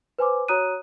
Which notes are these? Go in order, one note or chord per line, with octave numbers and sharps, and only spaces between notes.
B4 C5 G#5 C6 D6
F#4 C#5 A#5 D#6 F#6 D#7